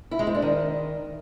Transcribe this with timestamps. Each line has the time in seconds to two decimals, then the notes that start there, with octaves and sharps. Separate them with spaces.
0.11 E4
0.19 G#3
0.27 C4
0.35 D4
0.42 D#3